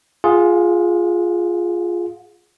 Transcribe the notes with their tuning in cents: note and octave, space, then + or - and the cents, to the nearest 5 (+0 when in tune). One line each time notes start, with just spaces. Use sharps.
F4 +0 G#4 +0 F#5 -35